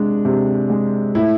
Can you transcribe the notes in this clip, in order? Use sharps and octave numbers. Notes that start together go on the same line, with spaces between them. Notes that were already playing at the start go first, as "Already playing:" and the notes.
Already playing: C3 G#3 D4
C3
G#3
A2 E4